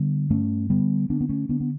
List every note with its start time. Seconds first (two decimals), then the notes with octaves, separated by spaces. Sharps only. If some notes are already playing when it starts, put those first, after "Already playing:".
Already playing: D3 G3 B3
0.30 G2 A3 C#4
0.70 D3 G3 B3
1.10 D3 B3 D4
1.21 B3
1.29 A3 C#4
1.49 D3 B3 D4
1.60 B3